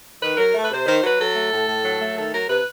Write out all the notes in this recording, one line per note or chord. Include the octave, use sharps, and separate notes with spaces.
D#3 B4
F#3 A#4
A3
B4
C3 C5
D#3 C5
F#3 B4
F#3 A4
A3
A2
A2
F#3
A3
D#3 A4
F#3 A#4
C3 B4